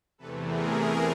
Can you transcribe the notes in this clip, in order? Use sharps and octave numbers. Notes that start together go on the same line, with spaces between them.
E2 C3 E3 A3 A4 B4
G#4 A#4